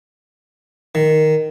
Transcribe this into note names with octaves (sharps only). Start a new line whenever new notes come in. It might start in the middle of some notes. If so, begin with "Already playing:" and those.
D#3